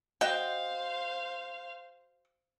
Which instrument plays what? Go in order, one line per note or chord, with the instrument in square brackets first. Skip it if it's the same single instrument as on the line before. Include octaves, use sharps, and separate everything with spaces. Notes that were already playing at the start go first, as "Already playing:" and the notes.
[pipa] F#4 G5 [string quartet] C5 F5 [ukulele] D#5